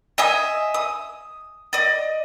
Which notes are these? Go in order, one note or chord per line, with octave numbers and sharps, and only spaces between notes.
D#5 E5 G#5 D#6
D#6
D5 D#5